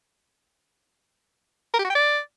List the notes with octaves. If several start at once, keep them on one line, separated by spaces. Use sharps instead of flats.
A#4
G4
F#4
G5
D5